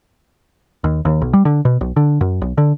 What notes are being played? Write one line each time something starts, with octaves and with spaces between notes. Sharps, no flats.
D#2
D#2
B1
G3
D3
B2
B1
D3
F#2
B1
D3